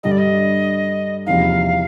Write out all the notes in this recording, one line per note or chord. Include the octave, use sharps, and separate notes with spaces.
G2 D3 G3 D#5
D5
D#5
E2 C3 F3 A#3 D#4 F5